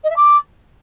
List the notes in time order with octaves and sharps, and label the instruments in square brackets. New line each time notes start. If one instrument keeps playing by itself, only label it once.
[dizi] D#5
E5
D6